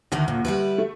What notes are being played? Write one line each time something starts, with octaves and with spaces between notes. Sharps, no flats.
D2 D3 D#3 A3
A#2
G3 E4 B4
A3